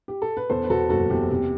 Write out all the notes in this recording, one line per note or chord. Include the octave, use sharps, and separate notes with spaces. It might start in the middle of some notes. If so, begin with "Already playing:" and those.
G4
A4
B4
E2 A4 C5
B4
E2 F#4 A4
F#1 F#4 A4
E2 G4
C3 G4